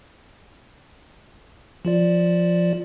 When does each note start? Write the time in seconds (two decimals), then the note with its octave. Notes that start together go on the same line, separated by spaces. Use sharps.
1.85 F3 F4 D5